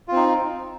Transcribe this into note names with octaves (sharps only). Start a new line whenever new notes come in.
C4 D#4 F4